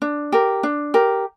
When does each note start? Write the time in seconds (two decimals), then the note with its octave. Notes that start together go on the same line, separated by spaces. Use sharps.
0.02 D4
0.32 G4 A#4
0.63 D4
0.94 G4 A#4